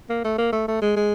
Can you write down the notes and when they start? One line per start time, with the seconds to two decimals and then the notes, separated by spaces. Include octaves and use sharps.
0.10 A#3
0.25 A3
0.38 A#3
0.53 A3
0.68 A3
0.82 G#3
0.96 G#3